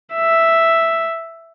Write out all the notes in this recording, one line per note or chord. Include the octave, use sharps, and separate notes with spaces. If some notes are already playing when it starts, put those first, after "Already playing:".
E5